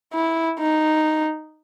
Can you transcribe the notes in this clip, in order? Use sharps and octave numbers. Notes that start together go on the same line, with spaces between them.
E4
D#4